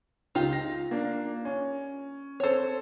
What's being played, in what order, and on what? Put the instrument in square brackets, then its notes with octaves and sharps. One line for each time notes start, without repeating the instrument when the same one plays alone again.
[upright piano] C#2 [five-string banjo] D#4 F4 G4
[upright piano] A#6
A#3 D4
C#4
[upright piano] C4 A4 [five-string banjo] C5 C#5